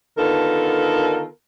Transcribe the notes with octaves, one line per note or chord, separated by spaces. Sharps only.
D3 D#3 B3 F4 A4 A#4